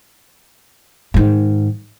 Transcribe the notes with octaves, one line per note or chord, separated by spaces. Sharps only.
G#2 D#3